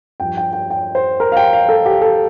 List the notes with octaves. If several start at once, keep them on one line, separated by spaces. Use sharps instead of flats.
G2 F3 G5
G5
G5
G5
C5
A#4
F5
G5
F5
A4
G4
A4